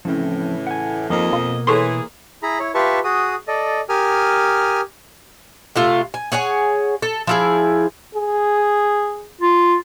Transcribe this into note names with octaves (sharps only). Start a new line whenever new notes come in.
A2 C#3 E3 F3 C4
F#5 G#5
F2 F3 A#3 D#4 D#5
B2 F4
E3 G#4 A4 C#5 C6
E4 G#4 A#5 B5
E4 C#5
F4 G4 B4 E5 A5 C#6
F#4 G#4 D#6
A4 D5 D#5
G4 A#4 G#5 D#6 F6
C3 A3 F4
G#5
G#4 C#5 F#5 G#5
A4
F3 E4 G#4
G#4
F4